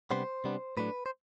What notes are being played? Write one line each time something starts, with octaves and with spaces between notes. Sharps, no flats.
C3 G3 B3 D4 C5
C3 G3 B3 D4
A2 F#3 A3 D4 B4
C5